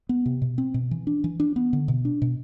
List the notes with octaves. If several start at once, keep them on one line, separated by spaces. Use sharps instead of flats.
B3
C3
B2
C4
B2
E3
D4
E3
D4
B3
D3
B2
D4
B2